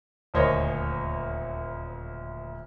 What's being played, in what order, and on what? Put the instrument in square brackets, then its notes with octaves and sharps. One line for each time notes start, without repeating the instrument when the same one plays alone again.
[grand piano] D#1 D2 A#4 C5 C#5 D#5